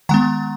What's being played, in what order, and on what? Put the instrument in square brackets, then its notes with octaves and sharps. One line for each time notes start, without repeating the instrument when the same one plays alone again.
[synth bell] D#3 G#3 B3 F#5 A#5